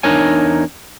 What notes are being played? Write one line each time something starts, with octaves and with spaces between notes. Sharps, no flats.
E2 D4 D#4 A#4 C#5 G#5